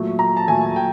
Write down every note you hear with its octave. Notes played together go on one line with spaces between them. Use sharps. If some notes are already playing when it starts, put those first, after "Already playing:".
Already playing: A#2 F#3 A3
A#5
A5
A#2 F#3 A3 G#5
G5